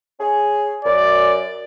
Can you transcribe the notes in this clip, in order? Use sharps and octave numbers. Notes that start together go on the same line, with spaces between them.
C#4 G#4
F#2 D5